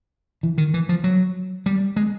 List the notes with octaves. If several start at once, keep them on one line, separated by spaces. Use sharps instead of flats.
E3
D#3
E3
F3
F#3
G3
G#3